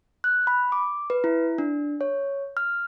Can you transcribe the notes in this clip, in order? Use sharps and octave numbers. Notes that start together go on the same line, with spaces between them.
F#6
B5
D6
B4
E4
D4
C#5
F6